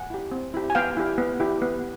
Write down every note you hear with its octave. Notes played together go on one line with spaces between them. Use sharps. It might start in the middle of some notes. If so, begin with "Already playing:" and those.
Already playing: F#5 G#5
E4 G4
C4
E4 G4
G#5
B3 F5 G5
E4 G4
B3
E4 G4
B3